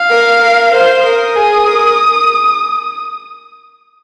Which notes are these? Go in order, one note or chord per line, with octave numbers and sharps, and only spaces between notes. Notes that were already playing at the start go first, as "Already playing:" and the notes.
Already playing: F5
A#4
A#4
C5
A#4 D#6
G#4
A#4